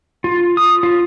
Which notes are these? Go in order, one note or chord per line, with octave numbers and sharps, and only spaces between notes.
F4
D#6
F4